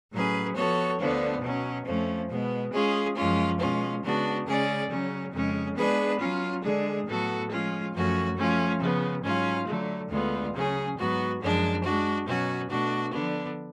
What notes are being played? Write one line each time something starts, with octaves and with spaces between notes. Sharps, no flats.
A2 F#3 C#4 G#4 B4
F3 B3 F#4 A4 C#5
D2 D3 F3 B3 D4
B2 F#3 C#4
F2 F3 A3 C#4
B2 G#3 B3
G#3 C#4 F4 G#4
F#2 F3 G#3 C#4 F4
B2 G#3 C#4 F4
C#3 G#3 B3 D4 F#4
C#3 G#3 C#4 G#4 D5
C#3 F#3 C#4
F2 C#3 G#3 C#4
G#3 B3 D4 G#4 B4
F#3 C#4 F4
D3 G#3 D4 G#4
A2 F#3 B3 F#4 A4
F3 G#3 C#4 F4
F#2 F3 A3 C#4 F#4
F3 A3 C#4 F4
C#3 F3 B3
G#2 F#3 C#4 F4
D3 F#3 A3
D2 D3 G#3 B3 F4
C#3 F#3 C#4 G#4
G#2 F#3 B3 F#4
F#2 F3 G#3 D4
G#3 D4 F#4
B2 F#3 C#4 F#4
B2 A3 D4 F#4
D3 F3 B3 D4